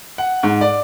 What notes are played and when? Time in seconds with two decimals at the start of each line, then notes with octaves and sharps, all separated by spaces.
0.18 F#5
0.43 G#2
0.61 D5